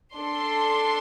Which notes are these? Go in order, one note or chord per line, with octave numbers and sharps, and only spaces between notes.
D4 A4 C6